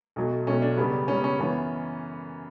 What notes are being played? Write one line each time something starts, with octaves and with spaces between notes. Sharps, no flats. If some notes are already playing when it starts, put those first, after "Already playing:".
B1 B2 F#3 A3
B1 B2 F#3 A3 C#4
D4
F#2 C#3 G3 B3
F#2 C#3 G3 B3 C#4
C#4
F#2 E3 B3 C#4